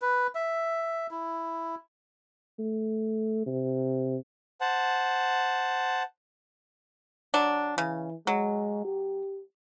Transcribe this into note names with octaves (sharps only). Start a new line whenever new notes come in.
B4
E5
E4
A3
C3
C5 F#5 A5
F#3 D4
C#3 E3
F#3 G#3
G4